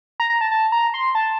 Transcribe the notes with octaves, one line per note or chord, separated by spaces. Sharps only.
A#5
A#5
A5
A5
A#5
C6
A5